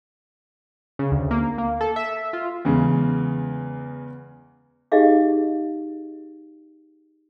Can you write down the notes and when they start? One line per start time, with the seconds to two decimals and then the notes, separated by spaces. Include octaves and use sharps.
0.99 C#3
1.11 D2
1.31 A#3
1.58 A#3
1.81 A4
1.96 E5
2.33 F4
2.65 E2 C#3 G#3
4.92 D#4 G4 G#4 D#5 F5 D6